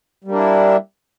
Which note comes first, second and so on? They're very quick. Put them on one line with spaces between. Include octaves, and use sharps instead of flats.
G3 A#3 D4 E4